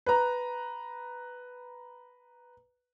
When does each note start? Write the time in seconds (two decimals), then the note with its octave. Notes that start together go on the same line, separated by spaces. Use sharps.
0.06 B4 A#5